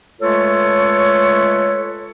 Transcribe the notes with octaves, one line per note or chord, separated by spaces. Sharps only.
G#3 A3 F4 A4 B4 C#5